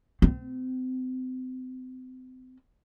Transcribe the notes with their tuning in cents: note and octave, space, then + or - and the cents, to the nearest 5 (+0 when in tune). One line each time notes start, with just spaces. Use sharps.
C4 -35